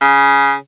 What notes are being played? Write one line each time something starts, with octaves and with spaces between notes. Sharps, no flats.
C#3